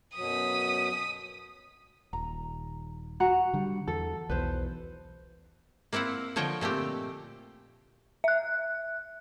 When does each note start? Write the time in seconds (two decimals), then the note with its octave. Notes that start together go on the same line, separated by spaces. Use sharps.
0.16 F#2 B2 F#3 D#6 B6
2.13 D#1 A#5
3.20 F#4 F#5 A#5
3.53 D3 G3
3.88 E2 A4
4.29 B1 E2 B4 C5
5.93 A#3 C4 E4 F5 F#5
6.36 D3 F3 C#5 D#5 G5
6.61 A#2 A3 C4 G4
8.24 E5 F#6